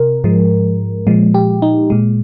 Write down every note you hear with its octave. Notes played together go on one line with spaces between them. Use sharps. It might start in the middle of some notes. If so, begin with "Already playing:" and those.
Already playing: C3 A#4
G#2 F3 G#3
A#2 F3 G#3
G4
D#4
A#2 G#3